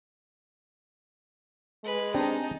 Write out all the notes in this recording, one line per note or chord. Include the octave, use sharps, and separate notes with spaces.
G#3 B4
C4 D4 D#4 G4 A5